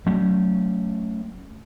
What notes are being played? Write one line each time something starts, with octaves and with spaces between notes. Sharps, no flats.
F#3 A3 C#4